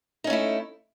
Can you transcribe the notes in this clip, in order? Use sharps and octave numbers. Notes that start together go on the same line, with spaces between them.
A3 C#4 D#4 E4